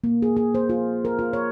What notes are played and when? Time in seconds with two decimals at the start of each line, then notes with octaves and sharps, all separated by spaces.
0.04 A#3
0.22 G#4
0.37 G#4
0.55 C5
0.69 F4
1.05 A#4
1.19 F4
1.33 C#5